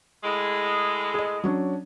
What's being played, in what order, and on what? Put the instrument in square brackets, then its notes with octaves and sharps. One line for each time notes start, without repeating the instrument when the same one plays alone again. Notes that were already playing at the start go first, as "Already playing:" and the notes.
[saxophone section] A2 G#3
[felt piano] G#4 D#5
F#3 C#4 D4